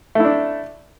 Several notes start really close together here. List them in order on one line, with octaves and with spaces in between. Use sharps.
A3 E4 D4